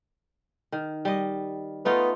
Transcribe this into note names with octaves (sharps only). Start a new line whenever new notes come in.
D#3
G3 D#5
A3 B3 D#4 F4